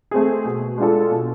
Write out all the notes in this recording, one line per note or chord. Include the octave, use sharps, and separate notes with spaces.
A3 C4 G#4
B2
G#3 D4 F4 A4
B2